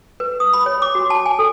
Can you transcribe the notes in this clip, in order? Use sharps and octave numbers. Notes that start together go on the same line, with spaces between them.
B4
D#6
B5
C#5
D6
F#4
A5
G#5
A4